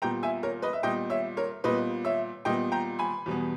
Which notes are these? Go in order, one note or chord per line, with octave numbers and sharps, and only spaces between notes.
A#2 G3 B3 G5 A#5
E5 G#5
A#4 C#5
B4 D#5
E5
A#2 G3 B3 D#5 G5
C#5 E5
A#4 C#5
A#2 G3 B3 B4 D#5
C#5 E5
A#2 G3 B3 D#5 G5
G5 A#5
G#5 B5
E2 B2 G3 B3